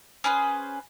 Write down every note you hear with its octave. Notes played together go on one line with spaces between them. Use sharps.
C#4 G#4 B4 C5